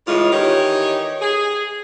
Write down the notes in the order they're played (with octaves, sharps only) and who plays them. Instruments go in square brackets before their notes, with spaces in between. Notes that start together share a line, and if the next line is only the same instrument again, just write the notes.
[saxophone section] A2 C#3 E3 G#3 F4
D#3 E3 D#4 G4 C#5
G#4